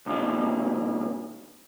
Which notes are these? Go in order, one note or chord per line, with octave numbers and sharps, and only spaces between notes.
B1 G2 A#2 D#3